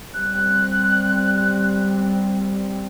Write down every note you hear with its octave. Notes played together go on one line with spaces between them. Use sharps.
G3 C4 F#6